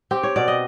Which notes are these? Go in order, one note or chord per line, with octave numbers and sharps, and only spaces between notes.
C4 G4
C#5
B2 D5
D#5